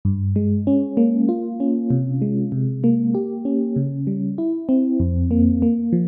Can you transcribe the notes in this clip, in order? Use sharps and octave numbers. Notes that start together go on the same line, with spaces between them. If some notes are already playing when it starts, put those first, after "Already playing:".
G2
G#3
C#4
A#3
F4
C#4
C3
G#3
C3
A#3
G4
C#4
C#3
G3
E4
C4
F2
A#3
A#3
F3